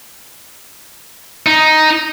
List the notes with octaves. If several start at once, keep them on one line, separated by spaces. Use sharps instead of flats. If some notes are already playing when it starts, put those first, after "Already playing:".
D#4